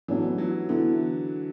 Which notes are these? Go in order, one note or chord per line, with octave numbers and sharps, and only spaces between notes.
A1 A2 E3 F#3 B3 D4
F#3
D3 E3 B3 E4 A4